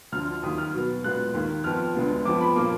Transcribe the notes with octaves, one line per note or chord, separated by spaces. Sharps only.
D2 D3 F3 F6
D#2 D#3 F#3 D#6
F6
B2 F#3 B3
A#2 G#3 B3 F#6
D#2 D#3 A#3
F2 F3 B3 F6
D2 D3 G#3 B3
F2 F3 B3 D6
B5
A#2 F3 A#3 D6